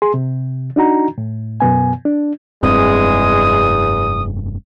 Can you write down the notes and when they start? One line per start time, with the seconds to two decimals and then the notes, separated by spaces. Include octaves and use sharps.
0.02 G#4 C6
0.14 C3
0.76 D4 D#4 F#4 A#5
1.18 A2
1.60 F#2 B2 B3 G#5
2.05 D4
2.63 F1 E2 G2 G#3 C4 D#6